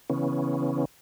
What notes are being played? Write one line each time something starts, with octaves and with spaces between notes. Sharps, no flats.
C#3 E3 B3 C#4